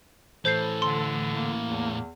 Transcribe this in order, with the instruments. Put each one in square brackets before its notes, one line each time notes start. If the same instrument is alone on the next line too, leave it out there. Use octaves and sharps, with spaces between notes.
[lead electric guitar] A2 E3 [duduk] A4 [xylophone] C5 G6 C7
[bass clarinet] D3 [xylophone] C6
[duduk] A#3
[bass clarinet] E2